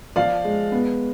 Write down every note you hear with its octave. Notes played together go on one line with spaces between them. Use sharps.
F3 D5 F5
G#3
B3